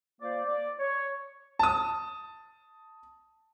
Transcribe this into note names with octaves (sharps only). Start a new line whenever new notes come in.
A#3 F4 C5 D5
D5
C#5
A5 D#6